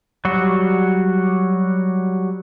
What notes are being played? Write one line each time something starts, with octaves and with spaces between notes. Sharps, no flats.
F#3 G3 F#4